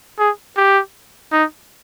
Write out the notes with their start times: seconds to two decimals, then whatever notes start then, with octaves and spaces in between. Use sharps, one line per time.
0.19 G#4
0.57 G4
1.32 D#4